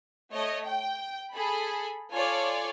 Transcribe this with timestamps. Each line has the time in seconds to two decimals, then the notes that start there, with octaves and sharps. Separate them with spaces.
0.33 A3 C#5 D#5
0.66 G5
1.33 G#4 A4 B5
2.13 F4 A4 C#5 D5 G#5